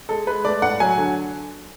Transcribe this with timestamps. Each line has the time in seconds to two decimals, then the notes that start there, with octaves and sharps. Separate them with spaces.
0.09 G#3 A4
0.27 G#3 B4
0.45 A3 D5
0.62 A2 F#5
0.80 F#3 G#5
0.97 D3